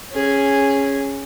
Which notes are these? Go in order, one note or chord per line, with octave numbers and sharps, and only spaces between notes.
C#4 G#4